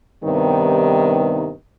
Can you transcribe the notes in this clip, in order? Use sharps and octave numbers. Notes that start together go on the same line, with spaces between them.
G2 C3 D#3 G3 B3 D#4